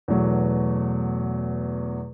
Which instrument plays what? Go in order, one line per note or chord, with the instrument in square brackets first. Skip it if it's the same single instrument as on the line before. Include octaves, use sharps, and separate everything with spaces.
[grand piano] E2 B2 F#3 A3